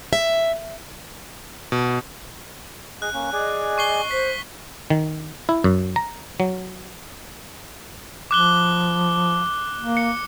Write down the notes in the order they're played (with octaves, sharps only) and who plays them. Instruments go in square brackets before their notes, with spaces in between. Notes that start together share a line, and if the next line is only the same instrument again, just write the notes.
[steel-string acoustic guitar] E5
[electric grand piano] B2
[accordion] G#4 D#5 [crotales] F#6
[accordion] A#3 C#4
[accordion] G#4 D5 G#5 [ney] D#5
[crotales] C#6 C7 G7
[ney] C5 [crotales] B6
[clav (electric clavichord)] D#3
E4
F#2
A#5
F#3
[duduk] F3 [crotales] D6 F#6 G7
[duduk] A#3
[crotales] C#7